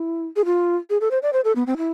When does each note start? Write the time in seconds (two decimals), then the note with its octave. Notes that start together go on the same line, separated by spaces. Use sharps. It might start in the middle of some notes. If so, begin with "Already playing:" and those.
Already playing: E4
0.36 G#4
0.45 F4
0.90 G#4
1.01 A4
1.11 C5
1.23 D5
1.33 C5
1.44 A4
1.56 B3
1.67 C4
1.78 E4